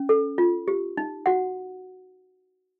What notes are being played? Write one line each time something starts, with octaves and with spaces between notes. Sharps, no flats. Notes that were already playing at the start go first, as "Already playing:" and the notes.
Already playing: C#4
A4
F4
G4
D#4
F#4 F#5